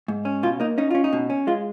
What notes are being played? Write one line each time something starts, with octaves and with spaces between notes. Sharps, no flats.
G#2
C#4
B2 F4
A#3 D#4
C#4 D#4
C#4 F4
D#4
B2
C#4
G#3 F4